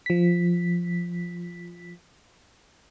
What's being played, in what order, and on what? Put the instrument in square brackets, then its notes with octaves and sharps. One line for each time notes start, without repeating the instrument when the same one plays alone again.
[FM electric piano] F3 B6